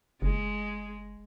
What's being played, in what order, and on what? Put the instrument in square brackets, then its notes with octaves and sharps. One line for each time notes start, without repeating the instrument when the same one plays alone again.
[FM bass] F#1 [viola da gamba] G#3